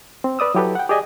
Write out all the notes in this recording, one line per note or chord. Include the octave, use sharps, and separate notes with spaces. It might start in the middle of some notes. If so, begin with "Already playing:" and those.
C4
B4 D5 D#6 E6
F#3 E4 G4 A4 B4
F#5 G5
G4 G#4 D5 D#5 G#5